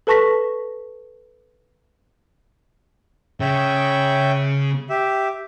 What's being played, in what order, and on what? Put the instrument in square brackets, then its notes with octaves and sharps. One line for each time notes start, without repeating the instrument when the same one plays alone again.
[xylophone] A4 B4 A5 C#6 A#6 B6
[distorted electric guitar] C#3 [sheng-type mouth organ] C#5 E5 G5
[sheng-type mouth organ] G4 E5